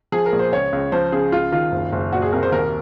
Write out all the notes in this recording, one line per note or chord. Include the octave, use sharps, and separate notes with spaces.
F3 G#4
A#4
A#1
C5
C#2 C#5
C#2
F3 C5
C#3 G#4
C#2 F4
D#3 F4
F#1
F#1
A#2 F#4
G#4
C2 A#4
C5
D#2 A#4